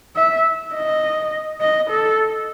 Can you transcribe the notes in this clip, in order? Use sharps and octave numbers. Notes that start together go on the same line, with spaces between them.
E5
D#5
D#5
A4